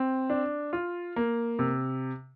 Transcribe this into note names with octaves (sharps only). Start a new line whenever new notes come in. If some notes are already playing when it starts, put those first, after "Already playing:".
Already playing: C4
D4
F4
A#3
C3